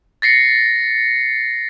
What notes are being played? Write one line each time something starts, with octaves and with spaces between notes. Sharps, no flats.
A6 A#6 C7 C#7